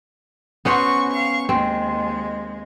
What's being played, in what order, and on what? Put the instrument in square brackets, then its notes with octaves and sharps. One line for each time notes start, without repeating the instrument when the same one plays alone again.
[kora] B3 C#4 C5 [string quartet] F#4 C#6
[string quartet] F5 C#6
[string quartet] D#2 G#3 [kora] C4